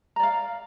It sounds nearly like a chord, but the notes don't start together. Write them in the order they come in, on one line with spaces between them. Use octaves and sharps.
A#5 D5 F5